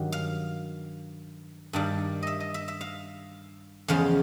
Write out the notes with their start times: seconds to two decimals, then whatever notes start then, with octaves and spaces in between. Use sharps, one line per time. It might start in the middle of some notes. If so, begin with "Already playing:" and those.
Already playing: G2 D#3 F#3
0.12 F5
1.73 G2 D#3 G3
2.23 D#5 E5
2.40 D#5
2.54 E5
2.68 E5
2.81 F5
3.88 E2 C#3 F3 G#3 F5